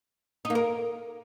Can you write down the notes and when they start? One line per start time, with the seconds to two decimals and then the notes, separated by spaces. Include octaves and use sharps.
0.45 D#4
0.50 A#3
0.55 A#4